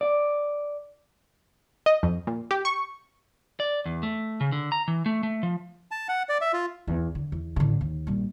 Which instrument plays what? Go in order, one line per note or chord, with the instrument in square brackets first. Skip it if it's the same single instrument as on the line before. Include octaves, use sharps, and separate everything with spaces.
[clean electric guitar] D5
[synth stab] D#5
F2
A#2
G4
C#6
[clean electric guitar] D5
E2
A3
C#3
D3
A#5
E3
A3
A3
F3
[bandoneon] A5
F#5
D5
E5
F4
[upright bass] E2
D3
E2
A1 D3
D#2
A#1 G3